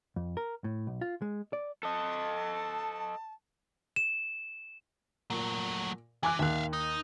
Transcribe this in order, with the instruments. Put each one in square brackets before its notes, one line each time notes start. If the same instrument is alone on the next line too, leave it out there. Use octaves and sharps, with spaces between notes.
[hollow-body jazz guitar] F2
A#4
A2
B1
F4
G#3
D5
[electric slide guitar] A4 D#5 [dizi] A5
[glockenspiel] E7
[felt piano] A#2 [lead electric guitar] F#3 A3
[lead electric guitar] E3 [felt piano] G#5 D6 F#6
[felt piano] D#2 F#6 [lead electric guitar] E5 F5
[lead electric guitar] D#4